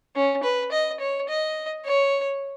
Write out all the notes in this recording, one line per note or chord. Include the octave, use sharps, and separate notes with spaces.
C#4
B4
D#5
C#5
D#5
C#5